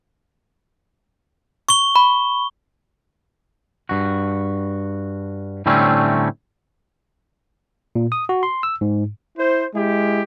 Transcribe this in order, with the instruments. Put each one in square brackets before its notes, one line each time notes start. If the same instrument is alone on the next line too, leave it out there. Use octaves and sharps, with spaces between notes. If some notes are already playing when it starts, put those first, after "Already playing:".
[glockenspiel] C#6 G7
[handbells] B5
[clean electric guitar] G2 F#4
A2 D3 G3 A3 C4 C#4
[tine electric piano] A#2
D#6
F#4
C6
E6
G#2
[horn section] E4 C5
G#3 E4 G4